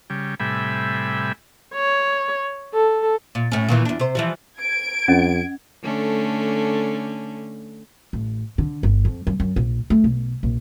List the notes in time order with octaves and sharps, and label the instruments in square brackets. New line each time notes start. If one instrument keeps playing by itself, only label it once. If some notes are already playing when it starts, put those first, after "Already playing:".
[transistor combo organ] C#3 G3
A2 C3 G3 E5 G#5 B5
[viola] C#5
A4
[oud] A#2
A2 C#4
A#2 D#3 E3
E2 D4
C3 C5
E3 F3 G3
[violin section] G#6 D7
[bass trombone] F2 [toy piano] C#4 D#5 F#5
[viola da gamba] D3 A3 C#4
[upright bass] A1
D3
G1
F2
F#2
F#2
A#1
A3
B1
A#1